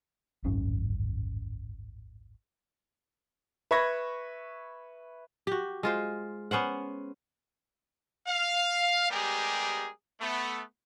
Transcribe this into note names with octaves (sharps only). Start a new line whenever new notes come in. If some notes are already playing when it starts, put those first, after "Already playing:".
D1 G#1 F#2 C#4
B4 E5 B5 C#6 G#6 A#6
F#4 G4
G#3 F4 C5
B3 C#4 C5 F#5
F5
G3 G#3 B3 G4 G#4 A#4
A3 B3